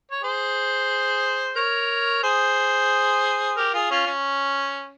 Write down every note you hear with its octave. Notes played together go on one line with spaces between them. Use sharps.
C#5
G#4 C5
A#4 C#5
G#4 C5
G4 A#4
F4 G#4
C#4 F4
C#4